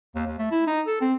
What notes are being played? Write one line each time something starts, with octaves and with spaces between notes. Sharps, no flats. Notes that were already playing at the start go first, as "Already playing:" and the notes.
D#2
D#2
A3
E4
D#4
A4
C4